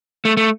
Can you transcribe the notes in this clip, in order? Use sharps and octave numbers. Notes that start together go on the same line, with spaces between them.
A3
A3